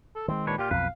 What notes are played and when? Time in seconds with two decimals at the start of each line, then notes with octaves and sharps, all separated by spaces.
0.16 A4
0.28 D#3 G#3 C4
0.47 A#2 D4 B4 C#5
0.58 A#2 F4 G4
0.71 B1 F2 B4 F5